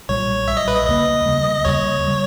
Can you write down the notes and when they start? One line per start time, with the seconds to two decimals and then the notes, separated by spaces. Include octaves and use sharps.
0.09 B1 A#2 G3 C#5
0.48 B1 A#2 G3 E5
0.57 D#5
0.68 B4
0.76 D#5
0.87 D#2 C#3 G3 A#3 D#5
1.26 D#2 C#3 G3 A#3
1.65 D#2 C#3 G3 C#5
2.06 C#3 G3